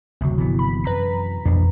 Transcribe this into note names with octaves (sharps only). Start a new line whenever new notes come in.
F#1 D2 C3 F#3
G1 E3 F3 B3
B5
F#2 B4 A#5 B6
E1 A#1 F2 D4